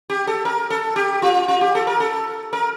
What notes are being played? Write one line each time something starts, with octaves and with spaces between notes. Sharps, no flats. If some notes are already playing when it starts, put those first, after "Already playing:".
G4
A4
A#4
A4
G4
F4
F4
G4
A4
A#4
A4
A#4